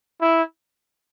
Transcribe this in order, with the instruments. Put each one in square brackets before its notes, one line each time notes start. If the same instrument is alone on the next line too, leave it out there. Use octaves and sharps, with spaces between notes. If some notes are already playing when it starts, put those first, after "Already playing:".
[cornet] E4